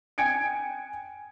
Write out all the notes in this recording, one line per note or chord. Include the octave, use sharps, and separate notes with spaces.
G5 G#5 G#6 C#7 D7